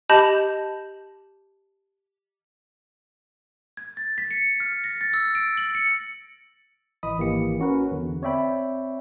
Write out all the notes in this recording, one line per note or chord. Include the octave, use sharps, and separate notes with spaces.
G4 D#5 A5 B5 G6
G#6
A6
B6
C#7
F6
A#6
A6
E6
D7
F#7
C#7
A1 E3 D#5 B5 D#6
G#1 E3 A#3 G4 C#7
C#4 F#4 A#4 B4
E2 D3
C4 C#5 D5 E5 G5 B5